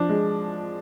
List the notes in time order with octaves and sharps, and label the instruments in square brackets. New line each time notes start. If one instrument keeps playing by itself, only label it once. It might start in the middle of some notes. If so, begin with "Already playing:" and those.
Already playing: [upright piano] F3 D4
G#3